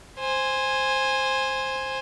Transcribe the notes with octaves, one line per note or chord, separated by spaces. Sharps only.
C5 G#5